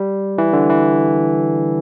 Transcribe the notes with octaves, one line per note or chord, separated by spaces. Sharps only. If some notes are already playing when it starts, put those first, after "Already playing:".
Already playing: G3
E3
D3
E3